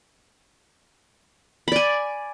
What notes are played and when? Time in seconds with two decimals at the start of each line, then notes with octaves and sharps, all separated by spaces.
1.68 B5
1.72 D5
1.76 G#5